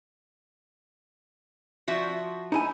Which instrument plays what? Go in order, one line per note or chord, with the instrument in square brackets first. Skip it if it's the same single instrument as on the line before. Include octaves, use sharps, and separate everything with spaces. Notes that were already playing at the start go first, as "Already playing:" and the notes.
[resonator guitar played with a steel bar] F3 F#4 E5
[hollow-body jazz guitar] D#4 E4 G#5